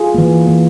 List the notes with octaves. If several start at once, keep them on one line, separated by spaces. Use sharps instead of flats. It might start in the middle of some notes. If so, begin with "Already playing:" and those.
Already playing: F4 G#4
E3 A#3
E3 A#3